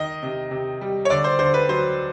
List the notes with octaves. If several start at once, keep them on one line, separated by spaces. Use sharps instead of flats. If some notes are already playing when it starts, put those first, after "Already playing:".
Already playing: D#3 D#5
C3
C3
G3
C#5
D3 D5
C5
D3 C5
B4
F#3 C5